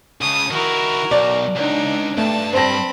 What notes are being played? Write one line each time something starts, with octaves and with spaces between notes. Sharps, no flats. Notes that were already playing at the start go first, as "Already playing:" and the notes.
C#2 C#3 A5 D#6
D#3 E4 F#4 A#4
B1 D5
C#2 D4 D#4
G2 A3 A5
C4 C5 A5 B5 A#6